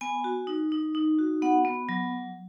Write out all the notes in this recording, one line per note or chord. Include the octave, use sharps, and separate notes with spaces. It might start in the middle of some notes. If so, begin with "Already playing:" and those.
B3 G#5
F#4
D#4
D#4
D#4
F#4
B3 F#5
B3
F#3